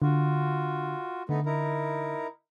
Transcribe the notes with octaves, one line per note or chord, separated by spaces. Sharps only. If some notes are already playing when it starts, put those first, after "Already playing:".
D3 F4 F#4
D3 A3 B3 D#4
D#4 E4 A#4